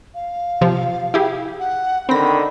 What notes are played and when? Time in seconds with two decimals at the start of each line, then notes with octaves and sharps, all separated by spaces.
0.15 F5
0.61 C3 F3
1.14 E4 G4 G#4
1.60 F#5
2.09 D3 D#3 C4 B5 A#6